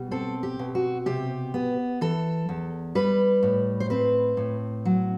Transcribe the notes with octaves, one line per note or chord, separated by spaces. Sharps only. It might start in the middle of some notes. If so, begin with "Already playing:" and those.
Already playing: B2 G3
C4 A4
G4
B2
F#4
C3 G4
B3
E3 A4
E2
G3 B4
A2
C5
C4 B4
A2
F#3